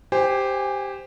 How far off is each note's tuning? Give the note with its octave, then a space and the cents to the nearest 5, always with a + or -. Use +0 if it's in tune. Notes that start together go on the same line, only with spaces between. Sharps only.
G4 +0 C5 -10 G#5 -25